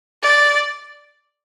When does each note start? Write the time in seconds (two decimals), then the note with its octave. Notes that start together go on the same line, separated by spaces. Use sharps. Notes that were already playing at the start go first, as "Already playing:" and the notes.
0.23 D5